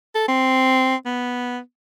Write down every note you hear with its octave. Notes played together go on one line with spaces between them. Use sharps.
A4
C4
B3